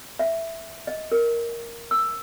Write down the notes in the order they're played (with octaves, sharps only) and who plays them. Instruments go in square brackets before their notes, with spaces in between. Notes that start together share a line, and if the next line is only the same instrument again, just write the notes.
[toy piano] E5
D#5
A#4
E6